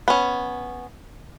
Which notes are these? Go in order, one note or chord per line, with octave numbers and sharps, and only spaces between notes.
B3 C#4